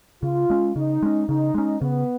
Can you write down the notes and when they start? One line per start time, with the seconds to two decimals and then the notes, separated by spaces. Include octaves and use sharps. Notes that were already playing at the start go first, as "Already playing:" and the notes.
0.23 C#3 F4
0.50 G#3 C#4
0.76 C#3 D#4
1.02 G#3 C#4
1.28 C#3 D#4
1.54 G#3 C#4
1.81 C#3 B3